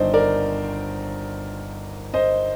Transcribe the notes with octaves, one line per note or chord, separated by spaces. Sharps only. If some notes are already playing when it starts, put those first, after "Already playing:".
Already playing: G1 G2 D#3 C5 D5 D#5
A#4 D5
C5 D#5